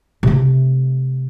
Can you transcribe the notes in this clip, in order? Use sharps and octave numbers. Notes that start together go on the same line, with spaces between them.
C3 A3